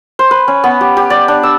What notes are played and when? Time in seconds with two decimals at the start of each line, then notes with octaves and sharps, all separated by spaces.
0.19 C5
0.31 B4
0.48 C#4
0.64 B3
0.81 G4
0.97 G4
1.10 D5
1.28 D4
1.43 E6